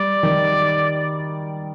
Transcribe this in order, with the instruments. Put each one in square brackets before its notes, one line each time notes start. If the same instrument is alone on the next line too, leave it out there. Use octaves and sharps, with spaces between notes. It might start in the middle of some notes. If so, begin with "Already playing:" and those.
Already playing: [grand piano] G3 [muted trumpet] D5
[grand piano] D#3